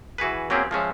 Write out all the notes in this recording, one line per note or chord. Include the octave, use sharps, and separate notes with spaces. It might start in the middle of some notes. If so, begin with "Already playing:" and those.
E3 F#4 G#4 B4
F#3 A#3 C4 C#4 G4 G#4
F3 G#3 C#4 E5